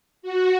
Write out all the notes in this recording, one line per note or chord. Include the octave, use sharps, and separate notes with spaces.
F#4